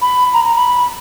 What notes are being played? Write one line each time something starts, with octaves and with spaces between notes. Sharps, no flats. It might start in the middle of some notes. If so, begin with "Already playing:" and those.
B5
A#5
A#5
B5